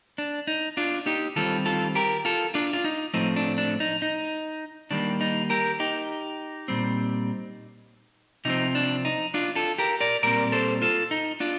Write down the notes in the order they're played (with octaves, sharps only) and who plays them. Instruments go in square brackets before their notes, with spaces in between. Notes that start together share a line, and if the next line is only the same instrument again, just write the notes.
[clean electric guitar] D4
D#4
D4 F4
D#4 G4
D#3 G3 C4 F4 A4
F4 A4
G4 A#4
F4 A4
D4 F4
F4
D#4
A2 F3 A3 C4 D#4
D4
D4
D#4
D#4
D#3 G3 A#3 D4
D#4
G4 A#4
D#4 G4
A#2 G3 C4
C3 F3 C4 D#4
D4
D#4
D4 F4
F4 A4
G4 A#4
A#4 D5
A#2 G3 C4 A#4 D5
A4 C5
F4 A4
D#4
D4 F4